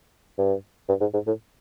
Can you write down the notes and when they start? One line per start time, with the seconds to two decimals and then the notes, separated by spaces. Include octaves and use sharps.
0.38 G2
0.89 G2
1.01 G#2
1.13 G#2
1.27 A2